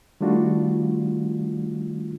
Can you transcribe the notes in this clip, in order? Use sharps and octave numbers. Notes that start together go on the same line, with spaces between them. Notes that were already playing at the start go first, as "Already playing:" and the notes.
D#3 G3 A3 D4 F4 F#4